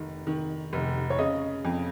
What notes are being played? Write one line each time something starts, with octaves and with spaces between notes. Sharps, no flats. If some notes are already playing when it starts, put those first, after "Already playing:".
Already playing: F1 D#3
D#3
F1
C#5
C#3 D#5
F2